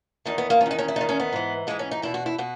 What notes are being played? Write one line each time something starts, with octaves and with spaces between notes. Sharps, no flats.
E2 D#3 D#4
B3
A#3
D#3 C#4
E2 D#4
C#4
E4
E2 D#3 D#4
C#4
B3
G#2 E3
G#2 E3 G#3
C#4
D#4
E2 B2 E4
F#4
E4
B2 F#4